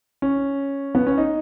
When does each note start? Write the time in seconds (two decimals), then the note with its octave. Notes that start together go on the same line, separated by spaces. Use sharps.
0.22 C#4
0.95 B3
1.07 C#4
1.18 D#4